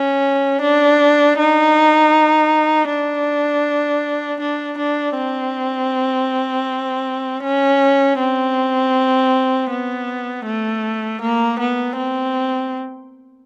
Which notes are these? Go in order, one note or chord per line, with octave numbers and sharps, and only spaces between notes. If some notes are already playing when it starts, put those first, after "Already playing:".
Already playing: C#4
D4
D#4
D4
D4
D4
C4
C#4
C4
B3
A3
A#3
B3
C4